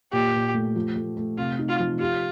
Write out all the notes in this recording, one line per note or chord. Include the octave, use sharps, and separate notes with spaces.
A#2 G4
A#2
A3
F3
A3
A3
C3 F4
D#4
F4
F3
F4 G4